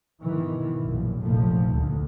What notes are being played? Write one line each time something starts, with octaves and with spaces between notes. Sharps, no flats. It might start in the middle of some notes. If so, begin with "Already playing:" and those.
G#2 B2 D#3 E3
A#1 F#2
F1 A#1 F3 A3
D2